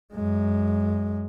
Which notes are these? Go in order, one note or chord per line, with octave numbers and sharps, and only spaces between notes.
F#2 G#3